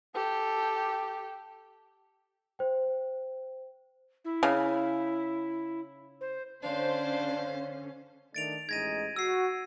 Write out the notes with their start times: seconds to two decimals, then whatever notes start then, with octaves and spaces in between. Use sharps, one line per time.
0.14 G4 A4
2.59 C5 G5
4.25 E4
4.43 C#3
6.21 C5
6.63 D3 C#4 D4 C5 F5
8.35 D#3 A3 D4 A6 D7 F7
8.69 A1 G#3 D#4 G#6 A#6 D#7
9.16 F#4 E6 C7